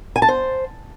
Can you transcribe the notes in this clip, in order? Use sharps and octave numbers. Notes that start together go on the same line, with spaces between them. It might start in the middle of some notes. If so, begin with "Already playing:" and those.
G#5
A5
C5